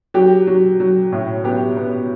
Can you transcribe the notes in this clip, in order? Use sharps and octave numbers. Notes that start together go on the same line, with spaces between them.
F#3 G4
F#3
F#3
A2
B3 G4
B3